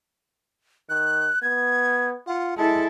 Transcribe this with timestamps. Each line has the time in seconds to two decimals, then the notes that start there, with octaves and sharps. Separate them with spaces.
0.89 D#3 F#6
1.42 B3 G#6
2.27 F4 F#5
2.57 G#3 E4 A4 A5